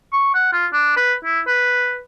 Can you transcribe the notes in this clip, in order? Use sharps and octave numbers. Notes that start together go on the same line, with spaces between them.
C#6
F#5
F4
D4
B4
E4
B4